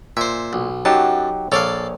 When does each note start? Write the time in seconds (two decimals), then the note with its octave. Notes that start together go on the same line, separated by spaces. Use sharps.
0.17 A#2 C5 E5
0.53 B1
0.85 F#2 F#3 D#4 G4 A5
1.52 A#1 A4 C#5 D5 F5